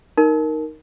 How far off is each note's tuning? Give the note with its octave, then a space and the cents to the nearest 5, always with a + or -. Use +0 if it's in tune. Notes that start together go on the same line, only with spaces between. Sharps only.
D#4 +0 A#4 +0